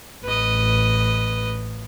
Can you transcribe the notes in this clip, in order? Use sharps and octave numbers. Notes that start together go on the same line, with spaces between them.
A1 B4 D#5